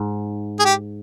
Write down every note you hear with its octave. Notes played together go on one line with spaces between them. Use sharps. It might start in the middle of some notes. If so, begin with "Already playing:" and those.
Already playing: G#2
G#4
G4